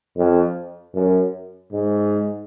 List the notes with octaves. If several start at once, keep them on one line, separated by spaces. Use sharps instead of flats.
F2
F#2
G#2